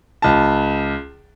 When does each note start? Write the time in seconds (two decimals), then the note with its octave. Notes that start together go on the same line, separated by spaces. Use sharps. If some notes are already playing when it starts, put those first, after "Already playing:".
0.22 C#2 A5